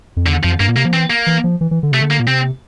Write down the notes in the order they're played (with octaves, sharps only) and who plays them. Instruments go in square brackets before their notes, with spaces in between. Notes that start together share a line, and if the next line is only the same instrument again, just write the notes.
[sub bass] F2
[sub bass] E2 [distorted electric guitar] D3
[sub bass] F2 [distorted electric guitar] F3
[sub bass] G2 [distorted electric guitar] A#3
[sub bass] A#2
[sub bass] C3 [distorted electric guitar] A#3
[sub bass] F3
[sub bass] E3 [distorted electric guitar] C4
[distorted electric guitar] A#3
[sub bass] E3
F3
E3
E3
D3
[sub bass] C3 [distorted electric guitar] A3
[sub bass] D3
[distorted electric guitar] A#3
[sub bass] A#2
[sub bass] C3 [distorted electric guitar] C4